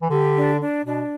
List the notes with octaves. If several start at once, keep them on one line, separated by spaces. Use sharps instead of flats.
E3
D3 G4
D4
D4
B2 D4